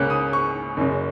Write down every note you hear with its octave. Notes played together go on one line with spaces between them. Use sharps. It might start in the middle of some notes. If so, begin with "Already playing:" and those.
Already playing: C#2 C#3 A#3 C#4 F#6
D#6
C#6
F#1 F#2 C#3